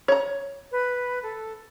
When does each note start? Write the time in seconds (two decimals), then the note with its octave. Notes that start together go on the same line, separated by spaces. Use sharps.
0.08 C#5 A#5
0.72 B4
1.23 A4